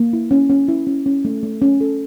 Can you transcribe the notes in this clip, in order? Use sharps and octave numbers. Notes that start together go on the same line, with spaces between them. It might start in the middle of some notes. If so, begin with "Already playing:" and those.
Already playing: A#3
E4
C#4
C#4
E4
C#4
C#4
A3
A3
C#4
A4